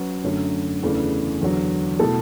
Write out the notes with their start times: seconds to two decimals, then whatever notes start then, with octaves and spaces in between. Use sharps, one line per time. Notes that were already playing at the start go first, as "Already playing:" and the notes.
Already playing: F#3 C#4 F#4 B4
0.24 F#2 D3 F#3 A3
0.83 E2 C#3 E3 A3 D4
1.41 E2 D3 F#3
1.99 B2 A3 E4 A4